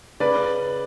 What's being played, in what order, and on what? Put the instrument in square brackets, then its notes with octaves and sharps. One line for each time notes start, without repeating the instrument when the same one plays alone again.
[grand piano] C#3 B4 D5